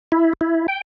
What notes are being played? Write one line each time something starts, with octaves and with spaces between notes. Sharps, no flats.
E4
E4
G5